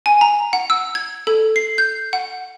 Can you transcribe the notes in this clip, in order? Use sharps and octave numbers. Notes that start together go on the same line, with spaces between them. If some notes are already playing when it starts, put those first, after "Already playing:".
G#5
A#5
F#5
E6
G#6
A4
C7
G6
F#5